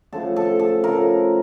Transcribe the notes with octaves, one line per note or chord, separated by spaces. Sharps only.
C#3 F3 A3 A4
A4
A4
C#3 F3 A3 A#4